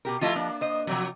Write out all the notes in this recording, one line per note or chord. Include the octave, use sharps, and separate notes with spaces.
B2 G4 A#4
F3 A3 E4 F4 D#5 A5
A#3 D4
C5 D#5
C3 F3 F#3